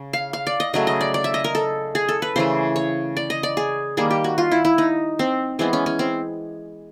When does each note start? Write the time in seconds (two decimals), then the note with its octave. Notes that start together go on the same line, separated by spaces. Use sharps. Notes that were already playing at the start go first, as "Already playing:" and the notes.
Already playing: C#3
0.13 F5
0.33 F5
0.47 D5
0.60 D#5
0.73 C#3 F#3 A3 D#5
0.87 D#5
1.01 D5
1.14 D5
1.24 E5
1.34 D#5
1.44 A#4
1.55 A4
1.95 G#4
2.09 A4
2.22 B4
2.36 C#3 E3 A3 C5
2.76 C#5
3.17 D5
3.30 D#5
3.43 D5
3.57 G#4
3.97 D#3 G3 A#3 G#4
4.11 G4
4.24 F#4
4.38 F4
4.52 E4
4.65 E4
4.78 D#4
5.19 C4
5.59 E3 G#3 B3 C4
5.73 C#4
5.86 C#4
5.99 C4